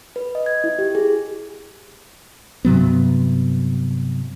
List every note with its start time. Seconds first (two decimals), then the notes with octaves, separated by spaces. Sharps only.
0.16 B4
0.35 D#5
0.46 G#6
0.64 E4
0.79 G4
0.95 G#4
2.65 G2 C3 F#3 B3